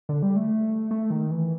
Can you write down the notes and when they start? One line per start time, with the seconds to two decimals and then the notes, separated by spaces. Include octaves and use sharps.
0.09 D3
0.22 G3
0.36 A3
0.91 A3
1.10 D#3
1.31 E3